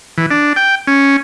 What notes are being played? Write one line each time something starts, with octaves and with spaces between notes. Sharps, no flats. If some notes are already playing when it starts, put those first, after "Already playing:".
E3
D4
G5
C#4